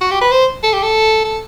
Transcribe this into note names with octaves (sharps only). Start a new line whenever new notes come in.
F#4
G4
B4
C5
A4
G4
A4
A4